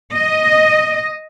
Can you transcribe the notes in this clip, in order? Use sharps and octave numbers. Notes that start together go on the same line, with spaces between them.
D#5